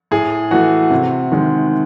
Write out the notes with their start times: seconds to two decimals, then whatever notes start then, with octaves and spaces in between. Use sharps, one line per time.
0.11 A2 G#4
0.51 E3 A3 F#4
0.91 C3
1.32 D#3 G#3